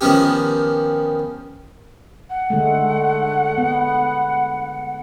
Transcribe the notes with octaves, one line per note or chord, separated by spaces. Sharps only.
D#3 F3 B3 C#4 G4
F#5
D3 G#3 A3
B3